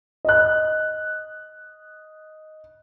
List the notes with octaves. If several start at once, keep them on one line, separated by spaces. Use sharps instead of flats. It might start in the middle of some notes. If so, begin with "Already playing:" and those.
D#5 F#6